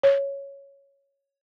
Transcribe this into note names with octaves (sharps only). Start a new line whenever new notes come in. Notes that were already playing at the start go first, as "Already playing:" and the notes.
C#5